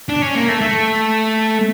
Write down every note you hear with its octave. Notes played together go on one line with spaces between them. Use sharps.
D4
C#4
A#3
A3
A3